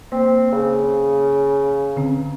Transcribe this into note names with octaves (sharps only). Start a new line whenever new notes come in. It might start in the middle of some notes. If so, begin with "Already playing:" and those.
A#3 C4
C#3
D3 C4 C#4